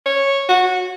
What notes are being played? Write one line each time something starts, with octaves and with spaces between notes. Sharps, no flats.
C#5
F#4